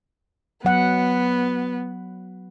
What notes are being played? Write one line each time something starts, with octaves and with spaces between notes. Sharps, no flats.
F#3 B3 F#5